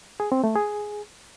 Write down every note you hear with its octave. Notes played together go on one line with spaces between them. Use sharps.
G#4
C4
A3
G#4